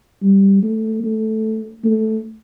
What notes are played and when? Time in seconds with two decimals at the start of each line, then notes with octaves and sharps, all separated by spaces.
0.22 G3
0.63 A3
1.04 A3
1.84 A3